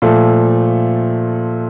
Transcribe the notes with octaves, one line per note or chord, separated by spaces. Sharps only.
A#2 F3 A3 A4